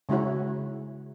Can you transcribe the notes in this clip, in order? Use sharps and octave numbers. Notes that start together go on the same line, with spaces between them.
C#3 G#3 E4 F#4 C#5